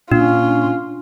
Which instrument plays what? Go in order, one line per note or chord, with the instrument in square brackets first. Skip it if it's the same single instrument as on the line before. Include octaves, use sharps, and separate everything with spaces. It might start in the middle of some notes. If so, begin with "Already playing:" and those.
[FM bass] A#2 [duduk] C#4 [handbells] D4 [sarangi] F4